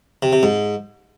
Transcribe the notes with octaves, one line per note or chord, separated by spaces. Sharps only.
C3
C3
G#2